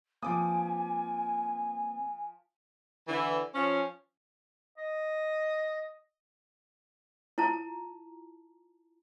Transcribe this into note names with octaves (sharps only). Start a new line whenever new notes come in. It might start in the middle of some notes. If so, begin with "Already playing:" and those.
F3 A#3 C4 G#5 D6 D#6
D3 E3
F3 C#4
D#5
E4 F4 A5 A#5